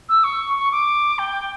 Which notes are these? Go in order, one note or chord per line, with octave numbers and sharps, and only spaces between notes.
E6
C#6
C#6
D6
G5